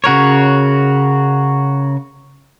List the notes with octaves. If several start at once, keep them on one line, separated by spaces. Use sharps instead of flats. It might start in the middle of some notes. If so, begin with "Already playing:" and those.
C#3 F#4 A#4 C#5